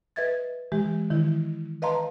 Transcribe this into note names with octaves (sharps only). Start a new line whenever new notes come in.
B4 D#5 E5 G#6 A6
E3 G#3 G4
D#3 E3 E4
B4 D#5 F5 A5 A#5 C6